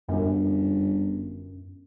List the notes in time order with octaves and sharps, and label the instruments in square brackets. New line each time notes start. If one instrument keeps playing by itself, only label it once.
[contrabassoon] G1 [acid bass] F#2